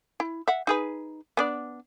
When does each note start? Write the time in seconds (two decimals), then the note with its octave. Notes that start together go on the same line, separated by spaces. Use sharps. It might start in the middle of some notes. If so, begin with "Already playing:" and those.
0.20 E4
0.48 E5 F#5
0.67 D#4 G#4 B4
1.37 B3 D4 D5